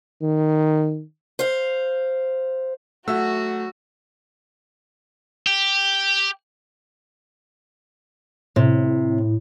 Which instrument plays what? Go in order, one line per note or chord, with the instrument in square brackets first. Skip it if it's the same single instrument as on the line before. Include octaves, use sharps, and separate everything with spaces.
[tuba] D#3
[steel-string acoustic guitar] C5 F5
[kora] F#3 E5 F#5 [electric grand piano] A3 E6 [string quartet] F#4
[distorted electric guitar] G4
[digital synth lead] A2 [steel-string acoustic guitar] C3